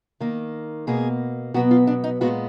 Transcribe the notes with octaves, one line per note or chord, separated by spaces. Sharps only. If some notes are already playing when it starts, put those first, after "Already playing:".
D#3 A#3
B2 A#3 G#4
B2 F#3 B3 F#4
F4
D4
D#4
A#2 G#3 B3 F#4